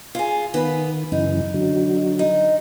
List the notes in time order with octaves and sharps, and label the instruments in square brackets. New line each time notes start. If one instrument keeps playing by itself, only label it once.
[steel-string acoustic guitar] F4 G#4
[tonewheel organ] D#3 [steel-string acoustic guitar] B3 B4
[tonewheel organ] F#2 C#3 E3 [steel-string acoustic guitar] D#4
[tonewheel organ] D3 F#3
[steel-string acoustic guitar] D#4